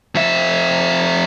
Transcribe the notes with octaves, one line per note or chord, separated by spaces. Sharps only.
F2 E5